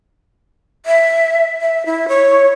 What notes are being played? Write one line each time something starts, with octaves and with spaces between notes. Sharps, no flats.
E5
E5
E4
C#5